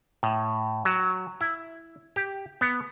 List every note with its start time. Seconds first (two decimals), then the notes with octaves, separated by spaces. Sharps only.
0.23 A2
0.85 F#3
1.41 E4
2.16 G4
2.61 B3